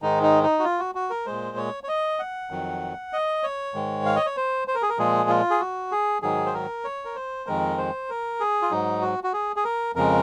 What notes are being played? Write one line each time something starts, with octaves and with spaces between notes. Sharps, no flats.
G#2 D#3 G#3 D#4
D#4
D#4
F#4
F4
F#4
F#4
A#4
A#2 G#3 C5
C#5
C#5
D#5
F#5
F2 D#3 F#3
D#5
C#5
G#2 D#3 G#3
F5
D#5
C#5
C5
C5
A#4
G#4
A#4
A#2 F3 G#3 G#4
F4
G#4
F#4
G#4
G#2 D#3 F#3 G#4
C5
A#4
C#5
A#4
C5
F2 D#3 G#3 A#4
C5
A#4
G#4
F4
G#2 F#3 D#4
F#4
F#4
G#4
G#4
A#4
F2 C#3 G#3 A#4